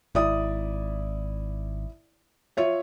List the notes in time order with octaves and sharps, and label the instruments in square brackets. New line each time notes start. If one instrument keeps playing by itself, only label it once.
[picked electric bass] G#1 [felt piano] E4 D5 D#6
[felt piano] F4 C#5 E5